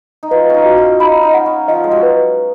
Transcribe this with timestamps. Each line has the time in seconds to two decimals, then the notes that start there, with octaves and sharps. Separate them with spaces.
0.23 D#4
0.31 F4 B4
0.49 C#4 D#4
0.65 F#4
0.78 F4
1.00 D#4 B5
1.23 D#4
1.34 F#5
1.46 C#4
1.68 F3 D#5
1.84 G#3
1.91 F#3
2.03 B4